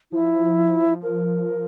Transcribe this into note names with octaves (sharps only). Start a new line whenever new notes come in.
F3 E4
A#4